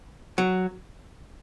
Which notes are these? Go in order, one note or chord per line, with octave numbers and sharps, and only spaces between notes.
F#3